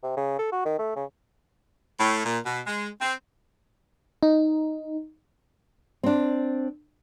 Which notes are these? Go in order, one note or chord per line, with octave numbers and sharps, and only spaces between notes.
C3
C#3
A4
F#4
D#3
A3
C#3
A2
A#2
B2
G#3
C4
D#4
C4 D4